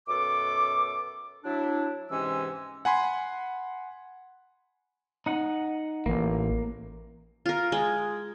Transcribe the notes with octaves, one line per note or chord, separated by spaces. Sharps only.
F#2 B2 A4 D6
F#3 D4 E4
G#2 C3 E3 G#3 C#4 E6
F#5 G#5 B5 C6
D#4 F#5
A1 A#3
F4 A#4
G#3